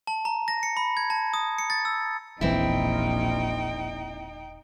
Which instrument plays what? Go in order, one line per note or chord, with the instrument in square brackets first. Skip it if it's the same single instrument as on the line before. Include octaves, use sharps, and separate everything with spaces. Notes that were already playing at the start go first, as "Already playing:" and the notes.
[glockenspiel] A5
A#5
A#6
C#7
B5
G#6
A5
D#6
C#7
A6
E6
[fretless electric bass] E1 E3 [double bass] A#1 [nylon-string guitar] C4 E4 [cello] D#4 G5